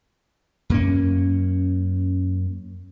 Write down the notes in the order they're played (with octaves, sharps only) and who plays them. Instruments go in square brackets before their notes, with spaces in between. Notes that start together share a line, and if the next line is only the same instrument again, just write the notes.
[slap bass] F#2 A#3 C#4